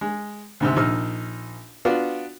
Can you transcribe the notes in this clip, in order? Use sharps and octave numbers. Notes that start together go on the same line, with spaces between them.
G#3
D2 G#2 C3
A#1 D#4 E6 F6
B3 D4 F4 F#4